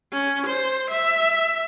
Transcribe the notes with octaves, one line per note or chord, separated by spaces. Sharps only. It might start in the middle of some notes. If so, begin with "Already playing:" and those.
C#4
C5
E5